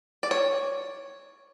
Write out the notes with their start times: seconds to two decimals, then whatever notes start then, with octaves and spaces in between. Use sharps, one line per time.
0.23 D5
0.31 C#5